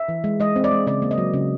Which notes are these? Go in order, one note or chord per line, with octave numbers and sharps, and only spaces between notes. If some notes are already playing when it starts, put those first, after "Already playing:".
Already playing: E5
E3
G#3
G#3 D#5
C4
D5
G#3
C#3 D5
A#3
D#5
F#3
C#3